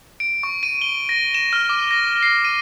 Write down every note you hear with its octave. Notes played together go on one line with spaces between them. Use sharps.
D7
C#6
D#7
G7
A#6
E7
F6
D6
A#6
C7
D#7